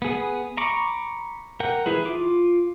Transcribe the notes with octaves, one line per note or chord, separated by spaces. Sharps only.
B3 G#4
A#5 B5 C#6 D6
A#4 F#5 G5
E3 E4 G#4 B4
F4 D6